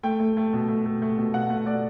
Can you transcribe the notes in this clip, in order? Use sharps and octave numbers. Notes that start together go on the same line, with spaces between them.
A3 G5
A3
A3
B2
A3
A3
A3
B2
B2 F#5
A3
A3 D5